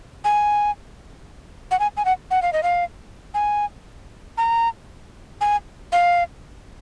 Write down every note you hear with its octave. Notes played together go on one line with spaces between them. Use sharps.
G#5
F#5
G#5
G#5
F#5
F#5
F5
D#5
F5
G#5
A#5
G#5
F5